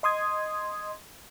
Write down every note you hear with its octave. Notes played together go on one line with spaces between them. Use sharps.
D#5 C6 D#6 G#6